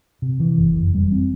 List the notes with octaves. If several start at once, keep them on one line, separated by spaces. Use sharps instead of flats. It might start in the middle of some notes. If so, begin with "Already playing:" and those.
C3
E3
F#1
F2
G3
C4